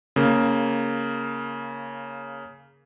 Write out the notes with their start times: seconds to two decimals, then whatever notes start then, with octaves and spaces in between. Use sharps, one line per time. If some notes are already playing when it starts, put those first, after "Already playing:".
0.16 C#3 A#3